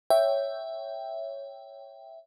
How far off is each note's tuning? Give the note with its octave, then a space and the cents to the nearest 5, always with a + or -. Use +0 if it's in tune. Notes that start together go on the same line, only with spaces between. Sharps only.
C#5 +0 E5 +0 G5 +0